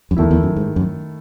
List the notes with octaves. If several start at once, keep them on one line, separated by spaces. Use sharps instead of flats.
F#2
E2 D#3 A3 E4
E2
F#2
G#2
F#2